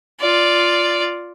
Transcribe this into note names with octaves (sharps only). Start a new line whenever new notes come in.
F4 D5